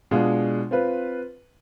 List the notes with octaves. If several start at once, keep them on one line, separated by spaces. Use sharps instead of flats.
B2 G#3 D4 F4
C4 F4 B4